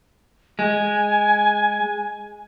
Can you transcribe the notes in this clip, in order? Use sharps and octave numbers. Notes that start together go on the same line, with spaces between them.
G#3 G#5